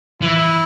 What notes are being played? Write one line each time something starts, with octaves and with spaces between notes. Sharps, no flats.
E3 E4